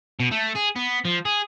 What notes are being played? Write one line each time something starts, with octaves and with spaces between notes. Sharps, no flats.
B2
A3
G#4
B3
F3
G#4